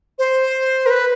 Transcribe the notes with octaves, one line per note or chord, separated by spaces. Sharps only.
C5
A#4
B4